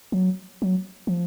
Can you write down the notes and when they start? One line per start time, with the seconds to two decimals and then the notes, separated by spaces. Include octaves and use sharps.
0.12 F3
0.16 F#3
0.62 F#3
1.07 F3